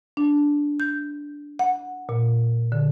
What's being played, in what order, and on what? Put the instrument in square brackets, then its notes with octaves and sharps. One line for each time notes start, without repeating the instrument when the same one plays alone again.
[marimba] D4
G6
F#5
A#2
D3